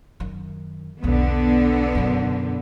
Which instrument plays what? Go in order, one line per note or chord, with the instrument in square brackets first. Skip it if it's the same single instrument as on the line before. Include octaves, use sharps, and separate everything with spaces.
[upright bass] F#2 D#3
[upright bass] B1 E2 [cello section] D3 B3
[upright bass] F#2 B2